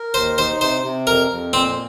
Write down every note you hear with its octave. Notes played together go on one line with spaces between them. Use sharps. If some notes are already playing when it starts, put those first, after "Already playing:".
Already playing: A#4
D#2 C5
D#4 C5
C3 C5
C3
F2 A#4
F2
A#2 C4